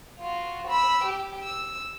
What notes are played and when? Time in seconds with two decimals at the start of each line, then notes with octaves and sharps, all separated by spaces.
0.19 F4 F#4
0.68 B5 E6
1.04 G4
1.43 E6